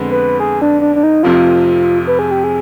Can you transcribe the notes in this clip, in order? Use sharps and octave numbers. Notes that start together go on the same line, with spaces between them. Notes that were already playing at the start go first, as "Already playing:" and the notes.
Already playing: F2 D3 G#3 B3
B4
G#4
D4
D4
D4
D#4
F1 F2 C3 F3 F4
B4
G#4
G4
G#4